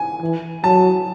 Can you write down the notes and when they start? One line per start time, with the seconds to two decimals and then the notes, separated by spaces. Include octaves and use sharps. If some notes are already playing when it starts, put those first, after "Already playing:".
Already playing: G#5
0.22 E3
0.64 F#3 A5